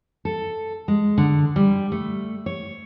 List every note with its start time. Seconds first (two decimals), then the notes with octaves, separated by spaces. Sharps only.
0.25 A4
0.88 G#3
1.18 D3
1.56 G3
1.92 A3
2.46 C#5